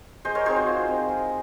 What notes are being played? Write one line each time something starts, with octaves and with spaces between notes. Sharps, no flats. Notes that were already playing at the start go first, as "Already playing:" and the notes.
G#3 C5 D#5
A#4 C#5
C4 D#4 G#4 C5
F#4
G#3 F4
C4 D#4
G#3